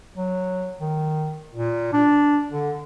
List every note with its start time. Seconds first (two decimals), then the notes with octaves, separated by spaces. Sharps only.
0.17 F#3
0.80 D#3
1.55 A#2
1.93 D4
2.52 D3